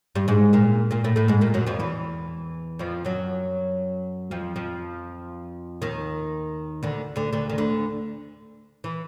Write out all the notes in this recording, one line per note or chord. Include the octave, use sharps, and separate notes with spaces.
G2 G3
G#2 G#3
A#2 A#3
A#2 A#3
A2 A3
A2 A3
G#2 G#3
A#2 A#3
F#2 F#3
F2 F3
E2 E3
F2 F3
F#2 F#3
F2 F3
F2 F3
D#2 D#3
D2 D3
D2 D3
D2 D3
D#3
D2 D3
E3